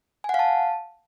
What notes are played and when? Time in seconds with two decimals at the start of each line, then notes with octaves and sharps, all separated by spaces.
0.24 G#5
0.29 F#5
0.34 F5
0.39 A5